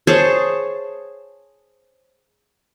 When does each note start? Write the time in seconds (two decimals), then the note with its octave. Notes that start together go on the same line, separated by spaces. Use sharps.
0.07 G#4 C5 C#5 A5